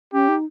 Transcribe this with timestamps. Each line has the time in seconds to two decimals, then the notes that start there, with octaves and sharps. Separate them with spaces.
0.13 C#4 G4
0.29 D#4